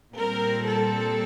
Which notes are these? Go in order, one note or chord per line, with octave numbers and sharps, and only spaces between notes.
A#2 G3 C4 A#4
A4